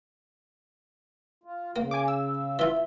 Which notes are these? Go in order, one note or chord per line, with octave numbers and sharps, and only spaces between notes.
F4
C#3 A#3
G#5 D6
E6
E3 F4 E5